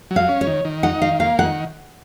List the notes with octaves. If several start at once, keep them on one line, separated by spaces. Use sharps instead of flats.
F#3
F5
C#4
C#5
D#3
D#3
D#4 F#5
D#3 F5
A#3 F5
D#3 F#5